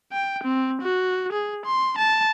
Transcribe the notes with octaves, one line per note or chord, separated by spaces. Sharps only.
G5
C4
F#4
G#4
C6
A5